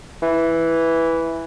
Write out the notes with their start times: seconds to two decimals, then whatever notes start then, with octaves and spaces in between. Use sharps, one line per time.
0.22 E3